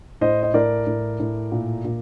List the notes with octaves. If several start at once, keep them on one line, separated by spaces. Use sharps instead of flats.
A2 C5 D#5
D#5
A2 A#4 D5
A2
A2
A#2
A#2